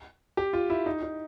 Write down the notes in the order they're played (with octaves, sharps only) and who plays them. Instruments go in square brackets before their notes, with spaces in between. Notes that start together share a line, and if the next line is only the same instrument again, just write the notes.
[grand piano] G4
F4
E4
D#4
D#4